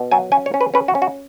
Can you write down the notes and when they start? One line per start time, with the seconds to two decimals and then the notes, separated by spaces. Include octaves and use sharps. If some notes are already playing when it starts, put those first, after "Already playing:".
Already playing: B2
0.12 F#3 G#5
0.32 C#4 G#5
0.46 C#5
0.54 C#4
0.61 B4
0.74 C#4 B4
0.88 F#4
0.95 C#4
1.02 F#4